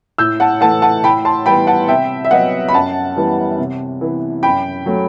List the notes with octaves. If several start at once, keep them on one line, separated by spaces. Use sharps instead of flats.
A2 E6 G6
F#5 A5
E3 A3 F#5 A5
F#5 A5
A2 G5 B5
A5 C6
E3 G3 B3 G5 B5
F#5 A5
C3 E5 G5
E5
F#3 B3 D#5 F#5
B5
F#2 F#5 A5
E3 G3 B3
C3
E3 B3
F#2 G5 B5
F#3 A3